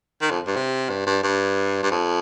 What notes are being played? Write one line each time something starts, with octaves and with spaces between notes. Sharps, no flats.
D#3
F2
G2
C3
G2
G2
G2
G2
F2